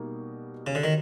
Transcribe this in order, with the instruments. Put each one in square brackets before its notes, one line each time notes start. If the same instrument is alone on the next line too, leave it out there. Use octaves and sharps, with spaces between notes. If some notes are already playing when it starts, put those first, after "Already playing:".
Already playing: [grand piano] B2 G3 A#3 D#4 F#4
[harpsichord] C#3
D3
D#3